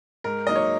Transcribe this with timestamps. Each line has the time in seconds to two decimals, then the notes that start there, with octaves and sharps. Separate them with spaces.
0.24 G#2 A#4
0.47 F#3 A#3 D#4 D#5
0.56 C#5